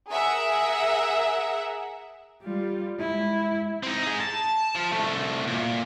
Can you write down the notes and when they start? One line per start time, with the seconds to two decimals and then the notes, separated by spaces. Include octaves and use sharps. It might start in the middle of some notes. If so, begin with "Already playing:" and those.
0.11 G#4 A#4 E5 F#5
2.43 G3 F4
3.00 G#3 E4
3.83 C4 D#4
4.03 D#4 G#4
4.20 A5
4.75 F3
4.92 C2 A3
5.47 A#2